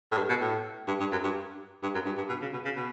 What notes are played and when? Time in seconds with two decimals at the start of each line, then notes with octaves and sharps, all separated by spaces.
0.11 A2
0.17 G2
0.29 B2
0.41 A2
0.88 G2
1.00 G2
1.12 F#2
1.23 G2
1.83 G2
1.94 F#2
2.05 G2
2.17 G2
2.29 B2
2.41 C#3
2.53 B2
2.65 C#3
2.76 B2